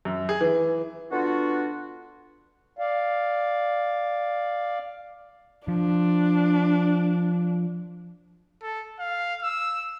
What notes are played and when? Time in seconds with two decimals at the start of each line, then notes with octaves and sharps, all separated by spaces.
0.05 F#2
0.29 G#4
0.41 E3
1.12 D3 B3 D4 F4 F#4
2.79 D5 F5
5.68 F3 D4
8.62 A4
8.99 F5
9.43 E6